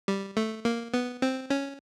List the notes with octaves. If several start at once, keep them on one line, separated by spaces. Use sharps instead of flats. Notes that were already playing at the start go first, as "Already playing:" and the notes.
G3
A3
A#3
B3
C4
C#4